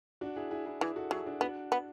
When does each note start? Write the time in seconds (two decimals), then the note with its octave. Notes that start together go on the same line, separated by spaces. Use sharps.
0.21 D4 F#4
0.36 E4 G#4
0.51 E4 G#4
0.66 E4 G#4
0.81 E3 E4 G#4
0.96 F#4 A4
1.11 F#3 E4 G#4
1.26 D4 F#4
1.41 B3 D4 F#4
1.72 B3